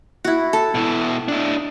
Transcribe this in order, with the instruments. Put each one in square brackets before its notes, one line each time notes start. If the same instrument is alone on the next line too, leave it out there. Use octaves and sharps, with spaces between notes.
[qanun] E4 F#4
A4
[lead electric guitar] B2 E4
D4 E4